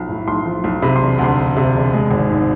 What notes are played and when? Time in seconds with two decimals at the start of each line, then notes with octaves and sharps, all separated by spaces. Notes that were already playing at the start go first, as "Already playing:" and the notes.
Already playing: B1 F3
0.09 A2
0.28 B1 C6
0.46 F3
0.64 B1
0.82 C3 B5
0.96 C6
1.01 E1
1.19 D2
1.24 C6
1.38 E1
1.57 C3
1.74 E1
1.93 G#3
2.11 G#1
2.30 G#2